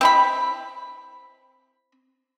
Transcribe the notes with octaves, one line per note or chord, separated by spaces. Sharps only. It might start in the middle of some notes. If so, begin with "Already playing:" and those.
C4 E4 B5